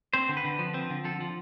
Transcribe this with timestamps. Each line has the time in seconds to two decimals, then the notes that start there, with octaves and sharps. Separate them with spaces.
0.14 C4 C5
0.29 D3
0.37 B4
0.45 D3
0.59 F3
0.74 C4
0.90 D3
1.04 F3 A4
1.20 F3